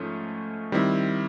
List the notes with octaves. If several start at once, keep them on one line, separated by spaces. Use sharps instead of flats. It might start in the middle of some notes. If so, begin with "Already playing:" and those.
Already playing: G#2 F3 A3 C#4
D#3 G3 C4 E4